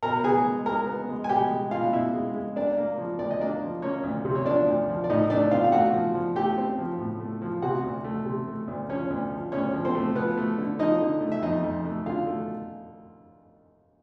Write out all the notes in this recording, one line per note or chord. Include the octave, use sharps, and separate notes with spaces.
B2 A#4 A#5
B3 G#4 G#5
G#3
G#3 A#4 A#5
B3
G#3
G#5
B2 G4 G5
G#3
B2 F4 F5
B2 E4 E5
G#3
G#3
A#3 D4 D5
A#3
F3
D2 D5
D#5
A#3 D4 D5
F3
A#3 C#4 C#5
D2
C3
C#5
F3 D4 D5
D2
F3
D5
A2 D#4 D#5
A3 D4 D5
C4 F4 F5
F5
A3 F#4 F#5
F3
F3
A3 G4 G5
C4
F3
A2
A3
F3
C3 F#4 F#5
D2
A3
C3
A3
D2
F3 C#4 C#5
D2
F3
D2 C#4 C#5
F3
C4 C5
A3
F3 B3 B4
A3
D3
F3 D#4 D#5
D3
A3
E5
F2 D#4 D#5
F2
A3
D3 F4 F5
A3